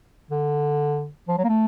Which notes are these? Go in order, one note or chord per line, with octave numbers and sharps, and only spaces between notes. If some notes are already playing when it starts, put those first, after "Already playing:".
D3
F3
F#3
A#3
A3